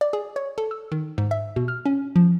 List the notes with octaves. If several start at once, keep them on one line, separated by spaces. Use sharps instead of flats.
D5
G#4
C#5
A4
E6
D#3
G#2
E5
B2
F6
C#4
F3